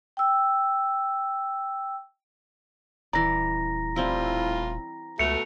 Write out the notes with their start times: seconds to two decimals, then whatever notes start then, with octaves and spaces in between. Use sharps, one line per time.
0.17 G5 E6
3.13 D#1 E3 D5 A#5 A#6
3.96 A2 G3 C4 E4 F4
5.19 C#2 B2 A3 C#7 F7